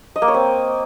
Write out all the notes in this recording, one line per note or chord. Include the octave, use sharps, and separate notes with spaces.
D#5
A#3
C#5
C4